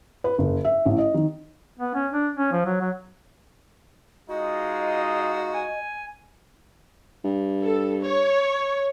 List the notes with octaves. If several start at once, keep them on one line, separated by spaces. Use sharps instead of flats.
B4
F#1
E5
A1
D#5
D#3
B3
C#4
D4
C#4
F3
F#3
F#3
G#3 D#4 F4 F#4 D#5
G#5
G2
A4
C#5